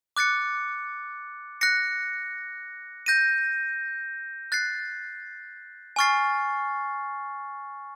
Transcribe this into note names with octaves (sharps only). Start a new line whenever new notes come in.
D6 F#6 A6 C#7
F#6 A#6 C#7
G6 A#6 D#7
F#6 A6 C7
G#5 C#6 F6 A6 C7